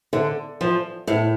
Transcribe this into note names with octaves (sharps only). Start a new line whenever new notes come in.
D3
F3
A2